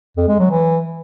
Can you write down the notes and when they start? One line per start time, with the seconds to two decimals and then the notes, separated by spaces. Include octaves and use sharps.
0.17 F2
0.28 G#3
0.39 F#3
0.51 E3